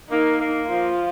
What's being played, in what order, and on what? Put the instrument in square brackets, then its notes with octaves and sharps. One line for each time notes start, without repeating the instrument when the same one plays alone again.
[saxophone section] A#3 [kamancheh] D#4
[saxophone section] A#3
[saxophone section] F3 [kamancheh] F4